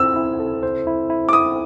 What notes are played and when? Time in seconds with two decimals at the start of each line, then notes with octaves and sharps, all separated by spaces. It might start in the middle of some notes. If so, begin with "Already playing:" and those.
Already playing: C4 E4 A4 C5 E6
0.16 E4
0.40 A4
0.63 C5
0.87 E4
1.10 E4
1.29 D6
1.33 E4 D#6